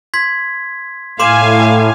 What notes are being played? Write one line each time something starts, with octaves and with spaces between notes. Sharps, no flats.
C6 G#6 B6
A2 F5 G#5 C6 D6 E7